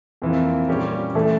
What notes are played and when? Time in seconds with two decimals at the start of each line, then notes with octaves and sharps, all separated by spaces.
0.22 F2 E3 A#3
0.68 A#2 G3 C#4 G4
1.15 E3 A3 E4 A4